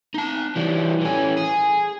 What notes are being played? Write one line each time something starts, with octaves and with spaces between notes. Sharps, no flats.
D#4 A5
E3 G3
E3 C#4
G#4